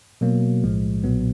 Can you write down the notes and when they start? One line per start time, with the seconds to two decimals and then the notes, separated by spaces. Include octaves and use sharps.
0.21 B2 F#3 A#3
0.63 B1 A2 F3 G#3
1.04 B1 A#2 F#3 B3